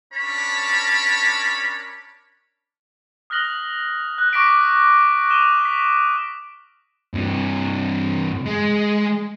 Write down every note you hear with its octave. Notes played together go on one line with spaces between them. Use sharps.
C#4 D4 A#4 C#5 A5 B5
D#6 F6 F#6 A#6 F#7 G7
F#6
C#6 D6 A#6 B6 D7
D#6 D#7 E7 G7
B6
G2 C3
G#3